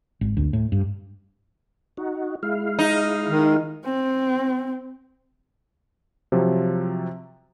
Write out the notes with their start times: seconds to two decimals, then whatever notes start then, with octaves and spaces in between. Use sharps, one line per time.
0.21 G#1
0.37 D2
0.53 A2
0.72 G2
1.97 D#4 F#4
2.43 G#3 E4 F5
2.79 D#4
3.29 D#3
3.85 C4
6.32 C3 F3 F#3